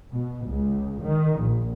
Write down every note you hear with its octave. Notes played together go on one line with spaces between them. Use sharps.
B2
C#2
D#3
A#1